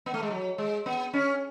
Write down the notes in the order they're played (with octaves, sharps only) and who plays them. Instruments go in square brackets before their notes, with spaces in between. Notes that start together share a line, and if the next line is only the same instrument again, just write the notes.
[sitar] B3
A3
G#3
F#3
G#3
B3
C#4